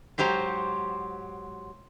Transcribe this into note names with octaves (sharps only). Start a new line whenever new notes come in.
G#2 F#3 G4 C5 A#5